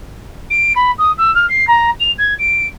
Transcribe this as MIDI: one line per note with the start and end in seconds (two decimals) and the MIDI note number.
0.50 0.73 98
0.75 0.91 83
0.98 1.11 87
1.17 1.33 88
1.34 1.46 89
1.49 1.65 96
1.67 1.90 82
1.99 2.11 101
2.18 2.34 92
2.38 2.66 98